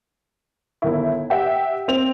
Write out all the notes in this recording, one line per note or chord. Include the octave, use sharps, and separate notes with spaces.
G1 D#3 E4
G4 E5 F#5 G5
C4 F7